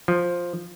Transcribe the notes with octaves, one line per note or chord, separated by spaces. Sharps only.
F3